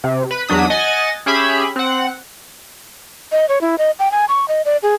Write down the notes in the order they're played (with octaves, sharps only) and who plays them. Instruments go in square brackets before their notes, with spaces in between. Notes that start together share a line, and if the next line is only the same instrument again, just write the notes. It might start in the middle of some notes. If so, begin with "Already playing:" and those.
[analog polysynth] C3
B4 B5
E2 F#3 D4 D#6 B6
D#5 F#5 G#5 A6
C#4 G4 G#4 E5 B5
C4 F#5
[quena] D#5
C#5
E4
D#5
G5
G#5
C#6
D#5
D5
G#4